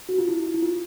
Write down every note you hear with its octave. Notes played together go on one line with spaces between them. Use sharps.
F#4
F4
E4
E4
F4